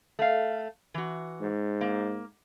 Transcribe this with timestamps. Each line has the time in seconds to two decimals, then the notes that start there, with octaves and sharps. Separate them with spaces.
0.19 A3 F5
0.94 E3 F#4
1.41 G#2
1.81 A#3